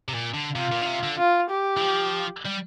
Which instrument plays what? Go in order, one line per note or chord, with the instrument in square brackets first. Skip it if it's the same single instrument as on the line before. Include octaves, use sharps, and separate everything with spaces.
[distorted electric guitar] C3
A#2
D3
[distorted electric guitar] C3 [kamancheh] F4
[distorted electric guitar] A#2
D3
C3
D3
[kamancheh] F4
G4
[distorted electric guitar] E3
F3
G3